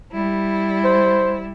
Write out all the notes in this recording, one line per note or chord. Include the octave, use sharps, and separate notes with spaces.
G3 E4
C5